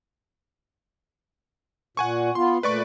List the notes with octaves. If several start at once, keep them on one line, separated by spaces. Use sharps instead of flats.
A#2 F#5 G#5 C#6
B3 F4 C6
A#2 A3 B4 D5 C#6